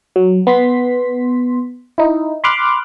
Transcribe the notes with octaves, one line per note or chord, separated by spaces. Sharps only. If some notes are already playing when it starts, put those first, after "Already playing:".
F#3
B3 C6 B6
D#4 E4
B5 C6 D6 F6 F#6